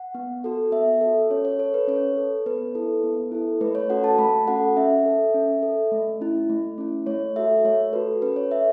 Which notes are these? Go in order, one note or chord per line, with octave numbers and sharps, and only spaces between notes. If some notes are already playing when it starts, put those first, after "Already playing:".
Already playing: F#5
B3
F#4 A4
B3 E5
F#4 A4
C#4 C#5
C#5
A4 C#5
B4
C#4 C#5
A4
B3 B4
E4 A4
B3
E4 A4
A3 B4
C#5
C#4 F#4 A4 F#5
A5
A3 B5
C#4 F#4 A4 F#5
C#4 E5
A4
C#4
A4
A3
C#4 E4
A3
C#4 E4
A3 C#5
F#4 A4 E5
A3 C#5
F#4 A4 B4
C#4 B4
C#5
A4 E5